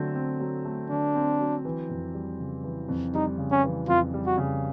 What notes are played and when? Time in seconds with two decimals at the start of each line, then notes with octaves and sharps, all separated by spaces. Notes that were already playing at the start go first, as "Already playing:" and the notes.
Already playing: D3 F#3 A3 C4
0.15 C4
0.40 F#3
0.65 A3
0.90 D3 D4
1.15 C4
1.40 F#3
1.65 E3
1.89 F2
2.14 G3
2.39 C#3
2.64 E3
2.89 F2
3.14 G3 D#4
3.38 C#3
3.51 C#4
3.64 E3
3.89 F2 F4
4.13 G3
4.26 F#4
4.38 C#3